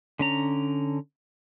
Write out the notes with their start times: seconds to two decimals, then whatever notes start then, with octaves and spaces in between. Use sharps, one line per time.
0.19 D3 C#4 A#5